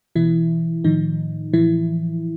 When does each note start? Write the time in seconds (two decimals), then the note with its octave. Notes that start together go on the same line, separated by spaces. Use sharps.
0.16 B2 E3 E4
0.84 A2 D#3 F3 D#4
1.53 A2 E3 F3 E4